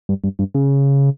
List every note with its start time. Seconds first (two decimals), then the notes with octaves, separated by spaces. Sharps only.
0.09 G2
0.24 G2
0.39 G2
0.55 C#3